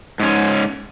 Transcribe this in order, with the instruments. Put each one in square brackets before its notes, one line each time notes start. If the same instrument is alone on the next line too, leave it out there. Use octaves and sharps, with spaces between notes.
[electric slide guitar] G#2 C#4